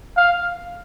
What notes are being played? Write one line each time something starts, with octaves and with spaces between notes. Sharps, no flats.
F5